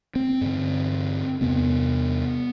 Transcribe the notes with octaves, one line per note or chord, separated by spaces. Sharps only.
C4
G2 D3
E2 C3 B3